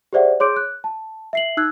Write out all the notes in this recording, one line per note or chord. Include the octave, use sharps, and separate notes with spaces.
G4 G#4 C5 D5 E5 F#5
G#4 C#5 C6 D6 G6 D7
F#6
A5
E5 C7 F#7
D#4 E6 F#6 G#6